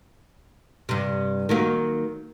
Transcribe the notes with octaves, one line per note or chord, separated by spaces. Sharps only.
G2 C3
D#3 F#3 A#3